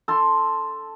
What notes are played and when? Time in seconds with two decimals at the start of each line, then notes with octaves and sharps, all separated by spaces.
0.08 A4 C6